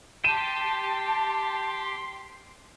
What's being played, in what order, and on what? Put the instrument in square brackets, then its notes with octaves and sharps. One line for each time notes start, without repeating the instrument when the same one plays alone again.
[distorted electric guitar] G4 G5 [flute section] A5 [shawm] C6 [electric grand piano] D#7 E7